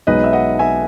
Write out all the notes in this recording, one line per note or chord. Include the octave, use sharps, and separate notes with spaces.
B1 B2 G#3 B3 D#4 B4 D#5
E5
D#5 F#5
E5 G#5